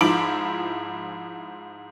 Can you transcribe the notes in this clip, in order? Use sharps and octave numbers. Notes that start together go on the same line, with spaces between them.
G#2 F3 E4 D6 D7 F#7